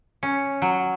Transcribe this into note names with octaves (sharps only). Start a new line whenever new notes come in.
C#4
F#3